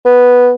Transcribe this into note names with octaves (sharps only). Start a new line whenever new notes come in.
B3